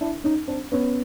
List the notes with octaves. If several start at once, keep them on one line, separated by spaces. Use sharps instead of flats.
D4 E4
C#4 D#4
C4 D4
B3 C#4